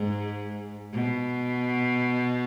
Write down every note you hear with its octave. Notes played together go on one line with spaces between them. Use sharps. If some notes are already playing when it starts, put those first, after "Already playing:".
Already playing: G#2
B2